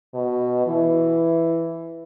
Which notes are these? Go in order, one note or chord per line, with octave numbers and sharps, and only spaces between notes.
B2
E3